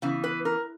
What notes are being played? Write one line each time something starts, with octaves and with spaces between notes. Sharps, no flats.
C#3 E3 B3
B4
A#4